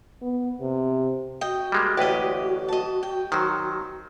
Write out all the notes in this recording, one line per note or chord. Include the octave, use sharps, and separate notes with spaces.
B3
C3
F#4 D#5 G5
G3 G#3 A#3
A1 D2 G4 B4 D#5
D#5 A5
G5
D#3 F#3 C5